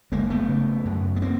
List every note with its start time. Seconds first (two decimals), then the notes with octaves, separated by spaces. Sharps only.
0.12 F#1 G#3 A#3
0.30 A3 B3
0.49 C#3
0.85 F#2
1.16 B3
1.22 A#3 C4